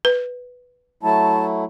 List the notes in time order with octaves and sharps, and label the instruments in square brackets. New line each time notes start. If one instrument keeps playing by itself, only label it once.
[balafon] B4
[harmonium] F#3 A3 E4 [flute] A5